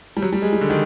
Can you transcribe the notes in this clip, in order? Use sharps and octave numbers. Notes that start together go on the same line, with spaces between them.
G3
F#3
G3
G#3
G3
D3
D#3